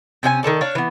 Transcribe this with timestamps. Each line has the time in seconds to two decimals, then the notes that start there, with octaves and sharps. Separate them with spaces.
0.23 C3 C#4 F#4 G#5
0.43 D#3 G#3 A4 D5
0.61 D4 C#5 F5
0.75 E3 B3